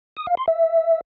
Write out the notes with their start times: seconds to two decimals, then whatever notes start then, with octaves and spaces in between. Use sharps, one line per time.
0.17 D#6
0.27 F5
0.37 C6
0.48 E5